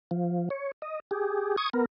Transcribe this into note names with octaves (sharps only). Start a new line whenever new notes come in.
F3
C#5
D#5
G4 G#4
C#6 D#6 G#6
B3 A#4